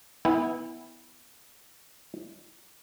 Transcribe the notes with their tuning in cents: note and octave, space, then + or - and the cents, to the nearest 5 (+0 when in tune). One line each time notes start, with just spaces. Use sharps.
B3 +0 E4 -15 G5 +45